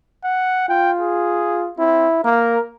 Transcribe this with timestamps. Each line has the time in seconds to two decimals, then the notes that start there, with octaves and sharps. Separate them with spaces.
0.24 F#5
0.69 F4 G5
1.00 G#4
1.78 C4 E4
2.24 A#3 A#4